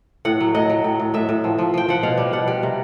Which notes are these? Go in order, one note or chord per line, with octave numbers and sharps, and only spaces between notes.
A2 F#5
F#3
A2 D#5
F#3
A2
A2
A2 E5
A2
F3
F3
F3 G5
F3 F#5
B2 F5
G3
B2 F#5
G3
C3